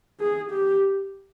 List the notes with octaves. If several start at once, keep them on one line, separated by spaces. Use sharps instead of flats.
G#4
G4